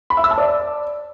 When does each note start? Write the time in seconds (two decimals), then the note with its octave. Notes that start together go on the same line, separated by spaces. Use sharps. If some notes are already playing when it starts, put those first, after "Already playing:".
0.10 B5
0.17 E5
0.24 E6
0.31 A5
0.38 D5